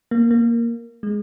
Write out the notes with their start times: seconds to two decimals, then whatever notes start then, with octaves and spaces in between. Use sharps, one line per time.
0.11 A#3
0.31 A#3
1.03 G#3